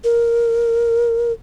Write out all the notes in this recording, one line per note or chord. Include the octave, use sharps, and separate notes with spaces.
A#4